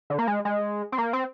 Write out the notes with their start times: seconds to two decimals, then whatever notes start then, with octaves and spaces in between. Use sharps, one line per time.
0.10 D3
0.19 A#3
0.27 G#3
0.45 G#3
0.92 C4
0.98 A#3
1.13 C4